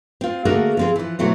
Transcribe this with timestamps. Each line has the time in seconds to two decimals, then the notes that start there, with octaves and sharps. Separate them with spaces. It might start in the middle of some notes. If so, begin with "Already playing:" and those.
0.21 C4 F4
0.45 D3 A3 A#3 F#4 G#4 A#4
0.77 F3 C4 G#4
0.96 E3 F3
1.19 B2 E3 F#3 A3 C4